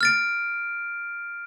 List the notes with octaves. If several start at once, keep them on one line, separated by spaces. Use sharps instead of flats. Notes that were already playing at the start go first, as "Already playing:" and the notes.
F6 A6 D7